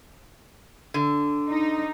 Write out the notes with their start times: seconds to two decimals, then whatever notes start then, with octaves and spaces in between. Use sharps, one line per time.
0.94 D3
1.48 D#4